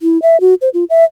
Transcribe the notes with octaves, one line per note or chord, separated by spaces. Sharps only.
E4
E5
F#4
C5
F4
E5